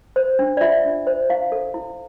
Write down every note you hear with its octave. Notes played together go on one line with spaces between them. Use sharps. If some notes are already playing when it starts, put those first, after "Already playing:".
C5
D4
D5
F4 E5
D4
C5
E4 F5
A4
E4